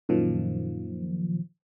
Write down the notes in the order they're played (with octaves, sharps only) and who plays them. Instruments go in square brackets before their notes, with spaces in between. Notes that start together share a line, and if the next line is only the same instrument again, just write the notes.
[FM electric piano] F#2 A#2 D#3 F3